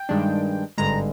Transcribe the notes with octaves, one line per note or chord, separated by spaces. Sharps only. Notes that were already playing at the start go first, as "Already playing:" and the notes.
Already playing: G5
G2 D#3 G#3 D4
G#1 G2 D3 G#3 A#5